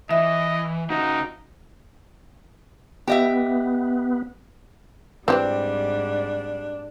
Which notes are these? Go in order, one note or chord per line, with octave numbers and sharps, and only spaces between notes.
E3 D#5 E5
C#3 D#4 F#4
B3 G4 D#5 E5
G#2 E3 G3 C4 D4 G4 B4